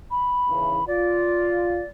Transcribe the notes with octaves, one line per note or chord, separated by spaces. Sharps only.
B5
D#2 C#3 E3
F4 D5